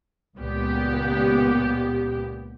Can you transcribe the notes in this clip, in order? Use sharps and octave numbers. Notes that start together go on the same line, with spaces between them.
C#2 A#2 B3 G4